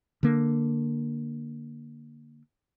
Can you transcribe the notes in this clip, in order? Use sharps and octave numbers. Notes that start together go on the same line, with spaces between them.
D3 A#3